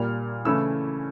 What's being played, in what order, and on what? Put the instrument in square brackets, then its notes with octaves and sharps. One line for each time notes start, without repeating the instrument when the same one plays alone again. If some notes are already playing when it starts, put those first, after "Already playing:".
Already playing: [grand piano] A#2 G3 A#3 F6
C#3 E3 A3 C#4 E4 E6